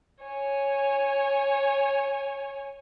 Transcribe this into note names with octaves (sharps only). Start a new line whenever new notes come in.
C#5 G#5